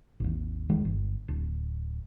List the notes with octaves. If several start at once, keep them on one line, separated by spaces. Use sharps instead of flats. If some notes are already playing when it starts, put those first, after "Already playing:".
G#1 D#2
E1 D#3 G#3
G1
D1